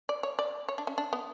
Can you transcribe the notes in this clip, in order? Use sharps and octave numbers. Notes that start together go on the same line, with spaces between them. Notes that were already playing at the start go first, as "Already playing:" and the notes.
D5
C#5
D5
C#5
D4
C#4
D4
B3